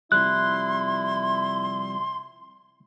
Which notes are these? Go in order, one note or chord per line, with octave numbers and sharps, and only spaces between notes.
C3 F3 G3 E4 C6 F#6